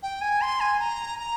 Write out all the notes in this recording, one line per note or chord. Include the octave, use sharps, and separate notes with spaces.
G5
G#5
C6
G#5
A#5
A#5